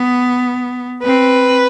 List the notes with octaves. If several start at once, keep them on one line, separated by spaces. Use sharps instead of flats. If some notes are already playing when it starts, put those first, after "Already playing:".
Already playing: B3
C4 B4